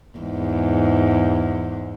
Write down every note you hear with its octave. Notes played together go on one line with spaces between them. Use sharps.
E2 G#2